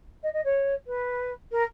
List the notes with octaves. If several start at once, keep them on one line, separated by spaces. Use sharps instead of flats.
D#5
D#5
C#5
B4
A#4